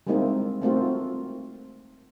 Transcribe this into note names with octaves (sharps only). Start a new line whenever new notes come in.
G3 G#3 A#3 C4 D#4 E4
A3 A#3 C4 D#4 F4 F#4